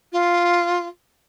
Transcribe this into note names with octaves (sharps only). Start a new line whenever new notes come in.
F4